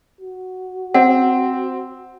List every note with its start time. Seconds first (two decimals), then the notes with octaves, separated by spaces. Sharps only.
0.20 F#4
0.94 C4 F#5